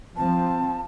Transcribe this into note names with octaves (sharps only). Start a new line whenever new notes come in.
F3 C4 A5